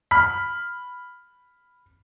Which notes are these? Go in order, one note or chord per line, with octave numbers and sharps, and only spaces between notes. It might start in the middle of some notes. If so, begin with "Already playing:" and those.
B5 F6 B6